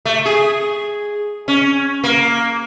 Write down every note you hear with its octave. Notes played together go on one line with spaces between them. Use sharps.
A3
G#4
C#4
A#3